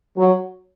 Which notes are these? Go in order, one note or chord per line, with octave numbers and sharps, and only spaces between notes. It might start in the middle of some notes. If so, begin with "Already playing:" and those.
F#3